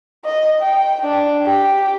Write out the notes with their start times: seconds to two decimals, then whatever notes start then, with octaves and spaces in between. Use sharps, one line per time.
0.25 D#5
0.62 G5
1.04 D4
1.46 G4